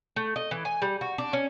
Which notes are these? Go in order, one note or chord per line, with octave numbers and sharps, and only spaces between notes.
A3
D#5
E3
G#5
G3
F#4
D4
C#4